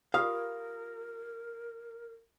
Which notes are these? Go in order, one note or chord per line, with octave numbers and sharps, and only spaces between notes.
F4 G4 A#4 F5 D#6